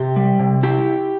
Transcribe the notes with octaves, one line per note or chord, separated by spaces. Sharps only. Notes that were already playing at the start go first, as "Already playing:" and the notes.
Already playing: C3 G4
G3
C3
E4 G4